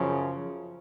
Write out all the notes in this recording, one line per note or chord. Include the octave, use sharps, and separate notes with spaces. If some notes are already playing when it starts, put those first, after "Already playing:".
Already playing: F#2 C#3 F3